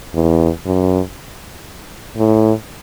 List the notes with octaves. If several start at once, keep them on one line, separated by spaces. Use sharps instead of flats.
E2
F#2
A2